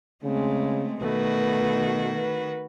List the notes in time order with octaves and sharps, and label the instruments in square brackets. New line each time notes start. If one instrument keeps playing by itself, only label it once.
[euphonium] C#3 [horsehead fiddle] G#3 C4 [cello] A3
[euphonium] B2 [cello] D#3 F#4 [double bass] A3 [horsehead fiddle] B4
[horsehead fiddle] B4